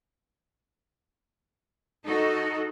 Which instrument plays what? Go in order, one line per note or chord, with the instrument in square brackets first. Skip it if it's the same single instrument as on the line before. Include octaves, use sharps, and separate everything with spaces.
[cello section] D#4 F#4 A4 D#5